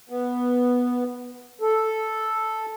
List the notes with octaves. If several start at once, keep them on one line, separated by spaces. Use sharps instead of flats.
B3
A4